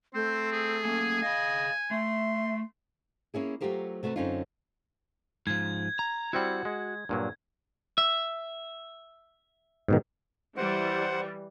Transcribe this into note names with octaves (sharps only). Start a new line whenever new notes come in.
A3 C4 C5
G#4
A#3 C#4 G#5
G#4 D#5 F5
A3 E5 C6
A#3 C#4 E4 G#4
F#3 A3 F4 G4 A#4 C5
C3 A3 F#4 A4 B4
F#2 D3 C4 C#4 D#4 F4
G#2 F3 G#6
A#5
G3 C4 E4 F#4 F#5
G#3
G2 A#2 F#3
E5
G#2 B2 D#3
E3 G3 C5 F#5